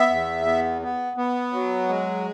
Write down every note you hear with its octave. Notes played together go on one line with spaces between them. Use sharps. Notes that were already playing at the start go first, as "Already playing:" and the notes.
Already playing: B3 E5
E2
B3
B3
B3
F#3
G#3